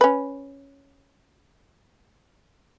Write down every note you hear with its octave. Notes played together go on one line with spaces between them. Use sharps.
C#4 B4